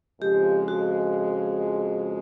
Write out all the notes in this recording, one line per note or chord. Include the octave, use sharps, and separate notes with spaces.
F2 C#3 F3 G#3 G4
F#4